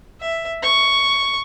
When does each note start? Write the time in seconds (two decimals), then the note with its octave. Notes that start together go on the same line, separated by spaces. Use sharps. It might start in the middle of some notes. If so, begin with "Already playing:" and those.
0.21 E5
0.63 C#6